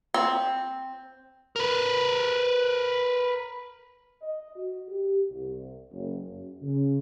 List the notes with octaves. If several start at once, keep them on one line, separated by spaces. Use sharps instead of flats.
C4
A#4 B4
D#5
F#4
G4
C2
F#1
F#2
C#3